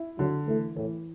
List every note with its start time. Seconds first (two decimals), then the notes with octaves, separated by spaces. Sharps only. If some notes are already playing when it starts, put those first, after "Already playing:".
Already playing: E4
0.19 D3 F#3
0.48 E3 A3
0.76 A2 E3